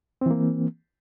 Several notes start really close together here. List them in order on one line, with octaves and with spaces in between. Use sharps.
C4 E3 A#3